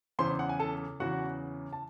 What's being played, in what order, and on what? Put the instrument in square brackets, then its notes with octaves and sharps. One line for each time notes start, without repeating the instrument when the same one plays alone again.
[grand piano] E2 C#3 E3 C5 C6
F#5
G#5
A4 A5
E2 C#3 E3 F#4 F#5
A5